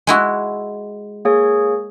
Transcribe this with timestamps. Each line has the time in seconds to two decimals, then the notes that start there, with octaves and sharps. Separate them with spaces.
0.07 G#3 E4 F#4
1.25 A#3 G#4 C#5